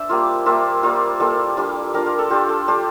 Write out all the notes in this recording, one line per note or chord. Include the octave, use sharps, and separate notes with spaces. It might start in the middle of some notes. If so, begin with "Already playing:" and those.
Already playing: D4 C5 E5
G3 A#3 F4
G3 A#3 F4 E5
G3 A#3 F4
G3 A#3 F4 A4
G3 D4 F4
G3 D4 F4 A#4
A#4
A4
G3 D4 F4 G4
A4
G3 D4 F4 G4